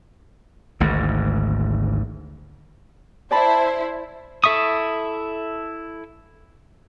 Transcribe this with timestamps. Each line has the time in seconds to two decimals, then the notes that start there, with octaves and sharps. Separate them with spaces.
0.80 G#1 D2 G#2
3.31 E4 C5 D5 A5 B5
4.44 E4 A4 E5 C#6 D#6